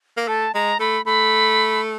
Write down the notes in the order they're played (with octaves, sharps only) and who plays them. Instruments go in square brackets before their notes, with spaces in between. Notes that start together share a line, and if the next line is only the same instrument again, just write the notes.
[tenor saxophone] A#3
[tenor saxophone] A3 [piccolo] A5
[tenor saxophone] G#3 [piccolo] A#5
[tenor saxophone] A3 [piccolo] B5
[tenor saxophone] A3 [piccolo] B5